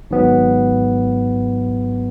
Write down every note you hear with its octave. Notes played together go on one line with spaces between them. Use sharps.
G#1 G#2 F#3 B3